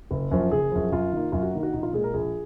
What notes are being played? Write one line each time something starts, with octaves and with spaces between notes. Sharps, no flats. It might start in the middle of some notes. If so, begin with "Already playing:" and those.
F#1
F#2 F3
F#1 G#4
F#2 F3
F#2 F4
D#3 A#3
F#2 F4
F#4
D#3 A#3 A#4
F#4
A#1 D#4
F4
A#2 G#3 G#4
A#4
A#1 G#4